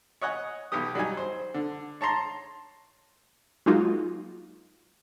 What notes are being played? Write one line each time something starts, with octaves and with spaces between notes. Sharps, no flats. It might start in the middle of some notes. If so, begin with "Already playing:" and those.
C#5 D#5 F#5 G#5
B1 B3 G4 D#6
F#3 G3 D#4 G#5
C5
D3
C#5 A5 A#5 C6
F#3 G#3 A#3 D#4 F4 F#4